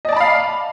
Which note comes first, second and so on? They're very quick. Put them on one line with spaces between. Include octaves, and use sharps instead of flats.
D#5 D5 A5 B5 F5